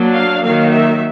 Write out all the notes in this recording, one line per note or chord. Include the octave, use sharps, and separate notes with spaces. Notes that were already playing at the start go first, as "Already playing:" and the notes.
Already playing: F#3 A#3 D4
F5
D#3 F#3 A#3 F5
E5